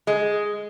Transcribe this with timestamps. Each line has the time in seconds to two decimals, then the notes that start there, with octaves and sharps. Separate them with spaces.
0.07 G#3